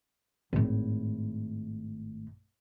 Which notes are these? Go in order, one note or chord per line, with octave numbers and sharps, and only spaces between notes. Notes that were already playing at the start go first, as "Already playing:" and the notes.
G#1 A2